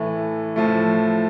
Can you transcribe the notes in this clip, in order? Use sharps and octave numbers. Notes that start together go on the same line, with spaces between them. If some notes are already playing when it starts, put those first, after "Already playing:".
Already playing: A2 E3 A3
A2 F3 A3